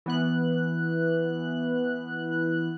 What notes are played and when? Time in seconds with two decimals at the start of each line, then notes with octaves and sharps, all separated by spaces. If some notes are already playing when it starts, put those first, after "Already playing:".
0.06 E3 B3 F#6